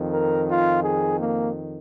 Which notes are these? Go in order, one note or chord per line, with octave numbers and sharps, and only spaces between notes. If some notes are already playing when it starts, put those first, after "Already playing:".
Already playing: F2 D#3
A#4
F4
G#4
A#3